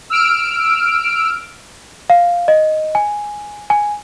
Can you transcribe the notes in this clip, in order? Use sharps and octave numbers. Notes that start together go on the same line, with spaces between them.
E6 F6 D7
F5
D#5
G#5
G#5